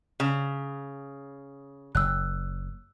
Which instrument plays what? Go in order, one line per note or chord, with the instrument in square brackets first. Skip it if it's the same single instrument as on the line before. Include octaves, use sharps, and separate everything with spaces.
[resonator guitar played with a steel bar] C#3
[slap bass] F#1 [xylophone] E6 F#6